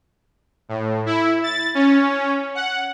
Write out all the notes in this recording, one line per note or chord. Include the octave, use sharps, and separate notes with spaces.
A2
E4
A6
C#4
F#5